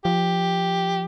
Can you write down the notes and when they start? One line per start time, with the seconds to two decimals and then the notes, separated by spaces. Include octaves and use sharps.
0.04 F3 G4